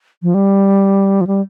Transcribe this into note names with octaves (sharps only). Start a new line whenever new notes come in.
F3
G3
F3
G3